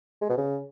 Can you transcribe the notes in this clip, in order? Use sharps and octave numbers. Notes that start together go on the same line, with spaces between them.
G#3
B2
C#3